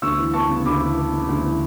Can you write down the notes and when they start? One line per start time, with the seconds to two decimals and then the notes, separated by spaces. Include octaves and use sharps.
0.02 D2 C#6 E6
0.19 E3
0.33 B3 A5 C#6
0.49 C#3
0.65 D2 B5 D6
0.82 E3
0.97 B3
1.13 C#3
1.29 D2
1.44 E3